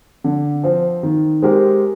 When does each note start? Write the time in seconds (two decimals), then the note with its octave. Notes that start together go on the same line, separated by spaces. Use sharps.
0.24 D3
0.63 F3 C4
1.03 D#3
1.42 G#3 C4 G4 A#4